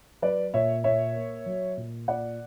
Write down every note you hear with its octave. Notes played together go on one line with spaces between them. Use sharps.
F#3 B4 D5
A#2 C#5 E5
A#2 C#5 E5
A#3
F#3
A#2
A#2 D5 F#5